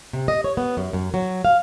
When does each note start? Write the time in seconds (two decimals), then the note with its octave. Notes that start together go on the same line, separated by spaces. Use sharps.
0.13 C3
0.28 D#5
0.44 C#5
0.57 B3
0.77 F#2
0.93 F#2
1.14 F#3
1.45 F5